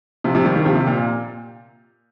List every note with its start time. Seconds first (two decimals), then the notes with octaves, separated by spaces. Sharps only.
0.24 C3 F3
0.35 C3 F3
0.45 D#3 G3
0.55 D#3 G3
0.65 C3 F3
0.75 C3
0.87 A#2
0.97 A#2